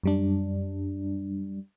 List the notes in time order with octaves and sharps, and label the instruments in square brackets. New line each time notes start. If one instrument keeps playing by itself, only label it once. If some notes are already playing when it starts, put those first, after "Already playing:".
[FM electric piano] F#2 G3 D4